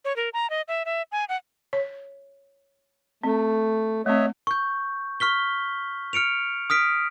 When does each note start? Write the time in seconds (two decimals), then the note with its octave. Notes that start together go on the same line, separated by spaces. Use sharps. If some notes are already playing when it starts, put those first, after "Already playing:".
0.05 C#5
0.16 A#4
0.34 A#5
0.50 D#5
0.68 E5
0.85 E5
1.12 G#5
1.29 F#5
1.73 C#5
3.24 A3 C4
4.06 A3 C4 C#5 D#5 E5
4.47 C#6 G6
5.20 C#6 F6 B6 G7
6.13 F6 C#7 D7 F7
6.70 D#6 F6 B6 D7